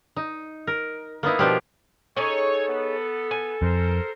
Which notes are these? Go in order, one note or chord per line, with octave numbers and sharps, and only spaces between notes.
D#4
A#4
A#3 B3 D#4 E4
B2 F3 A#3 D4 G4
C#4 D#4 G#4 A4 C#5
B3
G#5
F2 A#4 C5